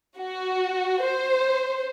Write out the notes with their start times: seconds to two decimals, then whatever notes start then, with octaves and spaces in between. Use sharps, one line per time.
0.18 F#4
1.01 C5